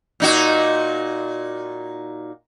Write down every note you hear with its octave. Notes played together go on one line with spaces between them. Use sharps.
A#2 D#4 F#4